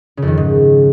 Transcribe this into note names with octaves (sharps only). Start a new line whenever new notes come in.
C#3
F2
D#3
C#3
G#2